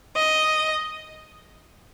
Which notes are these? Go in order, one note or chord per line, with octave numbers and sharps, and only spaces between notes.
D#5